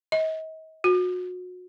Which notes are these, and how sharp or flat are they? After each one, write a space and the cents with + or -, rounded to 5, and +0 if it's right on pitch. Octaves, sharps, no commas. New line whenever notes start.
D#5 +40
F#4 -30